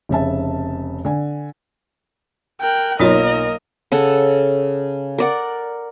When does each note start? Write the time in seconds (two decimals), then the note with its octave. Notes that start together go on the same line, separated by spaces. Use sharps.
0.09 F1 C#3 E5 A5
1.05 D3 G#5
2.61 A#4 G5 F#6
3.00 B1 F#3 A#3 D#4 F4 A#4 C#5 D#5
3.92 C#3 A4 F#5
5.18 A#4 D5 F#5